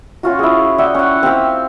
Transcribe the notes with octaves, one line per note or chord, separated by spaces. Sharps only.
C#4 F4 F#4
E4 G#4
D5 E5 F#5 G5
C#4 F#5
C4 G4 F5 E6